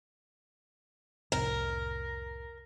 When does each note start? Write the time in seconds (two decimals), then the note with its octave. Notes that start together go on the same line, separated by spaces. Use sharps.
1.32 C2 F2 A2 A#4